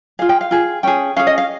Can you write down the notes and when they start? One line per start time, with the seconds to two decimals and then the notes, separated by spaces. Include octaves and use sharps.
0.19 F4 G#4 F5
0.29 G5
0.41 F5
0.51 F4 G#4
0.83 C#4 G#4 G5
1.16 C#4 G#4 F5
1.27 D#5
1.38 F5